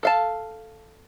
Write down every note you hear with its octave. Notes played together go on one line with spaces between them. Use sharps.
A4 F5 A5